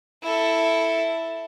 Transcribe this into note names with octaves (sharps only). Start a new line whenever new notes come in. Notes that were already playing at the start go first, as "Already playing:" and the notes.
E4 A4